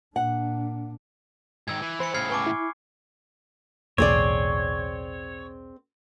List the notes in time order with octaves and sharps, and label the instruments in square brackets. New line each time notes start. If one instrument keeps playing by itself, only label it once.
[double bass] A#2 D4 [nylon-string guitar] F#5
[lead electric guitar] G#2 D#3 [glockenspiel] E6 G#6
[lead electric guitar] E3
[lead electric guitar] E3 [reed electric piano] C5 [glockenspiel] B5 C#7
[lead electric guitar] A2 C#3 [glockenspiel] F6 G#6 C7
[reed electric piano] B4 A5 [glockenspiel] G#5 C#6 D6
[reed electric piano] E4
[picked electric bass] B1 E2 A2 [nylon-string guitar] C4 G#4 D5 [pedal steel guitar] C#5